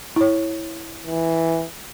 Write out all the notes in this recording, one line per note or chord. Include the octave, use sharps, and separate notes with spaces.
E4 C#5
E3